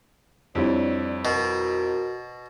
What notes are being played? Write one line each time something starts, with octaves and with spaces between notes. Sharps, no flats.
F2 G3 D4 E4 C#5
B2 F#4 A#4